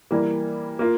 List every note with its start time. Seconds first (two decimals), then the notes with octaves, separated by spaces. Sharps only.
0.11 E3 G3 A#3
0.79 A#3 F4